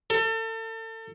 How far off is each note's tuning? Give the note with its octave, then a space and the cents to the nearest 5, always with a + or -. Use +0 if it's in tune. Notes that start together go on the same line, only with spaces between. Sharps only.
A4 +35